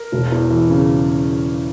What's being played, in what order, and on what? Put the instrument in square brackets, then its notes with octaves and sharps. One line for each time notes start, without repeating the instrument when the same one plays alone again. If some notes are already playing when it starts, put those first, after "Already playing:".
Already playing: [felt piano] A#4
E1
E2
E3
C#3